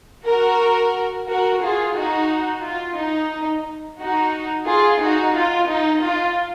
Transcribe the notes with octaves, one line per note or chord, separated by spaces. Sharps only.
F#4 A#4
F#4 A#4
F4 G#4
D#4 F#4
F4
D#4
D#4 F#4
F4 G#4
D#4 F#4
F4
D#4
F4